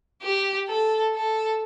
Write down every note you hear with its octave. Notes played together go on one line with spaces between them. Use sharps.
G4
A4
A4